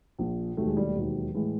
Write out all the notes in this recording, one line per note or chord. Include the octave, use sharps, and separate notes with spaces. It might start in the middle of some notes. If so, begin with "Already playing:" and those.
A#1 A#2 F3
E1 D#2 D#3 F#3 A3
G#3
G3 A3
E1 D#2 D#3 F#3
A2 E3 G#3